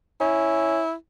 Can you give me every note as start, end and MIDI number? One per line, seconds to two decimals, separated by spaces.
0.21 0.82 61
0.21 0.93 64